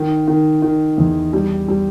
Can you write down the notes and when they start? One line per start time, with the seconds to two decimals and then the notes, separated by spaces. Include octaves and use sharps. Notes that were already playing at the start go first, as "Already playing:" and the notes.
Already playing: D#3
0.28 D#3
0.62 D#3
0.98 E2
1.33 G3
1.68 G3